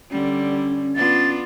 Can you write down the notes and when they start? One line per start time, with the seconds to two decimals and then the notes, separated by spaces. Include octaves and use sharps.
0.11 D3 G3 C#4
0.95 B3 D4 F4 A6